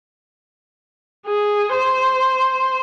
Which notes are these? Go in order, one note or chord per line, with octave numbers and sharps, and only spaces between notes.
G#4
C5